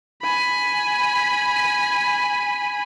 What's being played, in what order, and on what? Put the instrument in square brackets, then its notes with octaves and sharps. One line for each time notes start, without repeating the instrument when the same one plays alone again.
[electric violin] G#5 B5